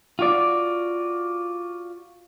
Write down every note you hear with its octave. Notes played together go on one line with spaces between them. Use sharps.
F4 F#4 D5